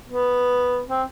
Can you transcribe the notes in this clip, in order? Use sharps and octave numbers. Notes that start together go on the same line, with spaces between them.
B3
C4